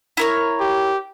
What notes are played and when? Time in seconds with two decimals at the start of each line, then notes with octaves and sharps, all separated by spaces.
0.17 E4 A#4 C#5
0.60 G4